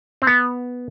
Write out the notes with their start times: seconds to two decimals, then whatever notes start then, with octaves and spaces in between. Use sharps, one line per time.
0.22 C4
0.27 B3